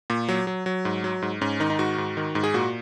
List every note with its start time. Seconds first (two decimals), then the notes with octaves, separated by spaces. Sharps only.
0.10 A#2
0.29 F#3
0.47 F#3
0.66 F#3
0.85 G#2
1.04 F#3
1.22 G#2
1.41 G#2 C#4
1.60 D#3 D#4
1.70 D#4
1.79 G#2 F#4
1.98 G#2
2.17 D#3
2.35 G#2
2.43 G#4
2.54 A#2 F#4